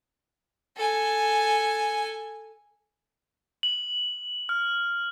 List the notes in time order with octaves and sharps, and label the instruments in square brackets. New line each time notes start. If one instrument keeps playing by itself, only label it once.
[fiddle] A4 G#5
[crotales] F#7
F6